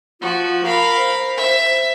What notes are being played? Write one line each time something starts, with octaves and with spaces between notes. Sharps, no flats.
F3 F4 F#4
A#4 F5 B5
C5
E5